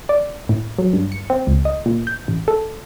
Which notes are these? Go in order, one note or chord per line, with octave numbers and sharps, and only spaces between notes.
D5
A2
F#3
G2
C#7
C4
C#2
D#5
A#2
G6
A1
A4